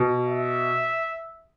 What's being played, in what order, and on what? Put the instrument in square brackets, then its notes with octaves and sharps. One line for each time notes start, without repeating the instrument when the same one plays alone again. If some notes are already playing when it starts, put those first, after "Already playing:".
Already playing: [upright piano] B2
[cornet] E5